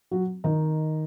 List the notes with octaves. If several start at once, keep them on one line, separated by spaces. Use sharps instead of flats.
F#3 F#4
D#3 D#4